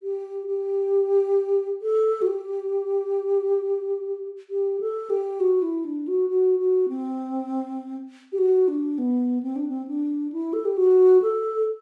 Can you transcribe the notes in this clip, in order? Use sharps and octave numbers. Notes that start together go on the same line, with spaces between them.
G4
G4
A4
F#4
G4
G4
A4
G4
F#4
E4
D4
F#4
F#4
F#4
C4
G4
F#4
D4
B3
C4
D4
C4
D4
E4
A4
G4
F#4
A4